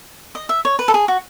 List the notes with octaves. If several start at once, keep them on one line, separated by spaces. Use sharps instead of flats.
D#5
E5
C#5
B4
A4
G#4
F#4